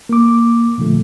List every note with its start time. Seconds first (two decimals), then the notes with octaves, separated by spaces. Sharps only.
0.09 A#3 D6
0.78 A#2 D3 F3 A3